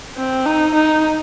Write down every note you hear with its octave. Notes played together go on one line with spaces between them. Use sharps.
C4
D#4
D#4